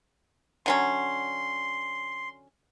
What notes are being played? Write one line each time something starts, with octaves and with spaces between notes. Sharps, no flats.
D3 F#3 C#4 C6